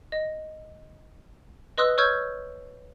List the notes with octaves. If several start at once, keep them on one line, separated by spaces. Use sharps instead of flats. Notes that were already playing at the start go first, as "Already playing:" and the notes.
D#5
B4 D#5 C6 D#6 E6 F#6
C#5 C#6 E6 F6 G6 G#6